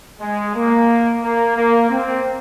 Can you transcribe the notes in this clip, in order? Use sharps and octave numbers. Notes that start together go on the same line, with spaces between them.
G#3
A#3
A#3
A#3
C4